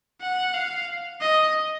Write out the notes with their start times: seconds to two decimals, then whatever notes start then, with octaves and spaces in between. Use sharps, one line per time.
0.21 F#5
0.54 F5
1.21 D#5